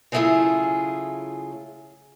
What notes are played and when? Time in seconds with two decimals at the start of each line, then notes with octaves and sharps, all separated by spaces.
0.12 C#3 F#3 A3 E4 F4 G#4